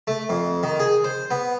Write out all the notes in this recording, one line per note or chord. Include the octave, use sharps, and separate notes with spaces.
A3
F2
D#3
G#4
C5
B3